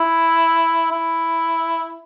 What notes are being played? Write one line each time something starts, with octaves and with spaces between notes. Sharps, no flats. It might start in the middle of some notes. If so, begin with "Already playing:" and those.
Already playing: E4
E4